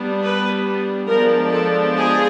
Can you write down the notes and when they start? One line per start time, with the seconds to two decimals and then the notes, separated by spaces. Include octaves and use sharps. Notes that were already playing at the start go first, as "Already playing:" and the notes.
Already playing: G3 B3 D4
0.21 B4
1.08 F3 G#3 B3 D4 A#4
1.52 A4
1.95 G#4